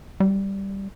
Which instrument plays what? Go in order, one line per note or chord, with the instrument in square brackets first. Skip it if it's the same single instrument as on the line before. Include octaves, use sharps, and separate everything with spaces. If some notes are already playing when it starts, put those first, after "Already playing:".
[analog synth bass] G3